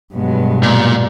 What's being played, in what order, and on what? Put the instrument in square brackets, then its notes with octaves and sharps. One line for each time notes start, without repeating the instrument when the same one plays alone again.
[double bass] G2 B2 [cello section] F#3 G#3 B3
[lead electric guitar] A#2